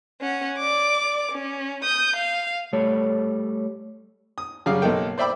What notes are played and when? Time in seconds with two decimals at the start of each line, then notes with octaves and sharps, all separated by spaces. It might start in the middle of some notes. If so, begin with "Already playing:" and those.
0.22 C#4 F#5
0.58 D5 D6
1.32 C#4
1.84 D#6 G6
2.16 F5
2.73 G3 A3 A4 C#5
4.38 D#6
4.66 F#2 C#3 G3 G#4 F5 D6
4.82 B1 A#3 B3 D#4 A4 G5
5.18 C5 D5 E5 G5 B5 D6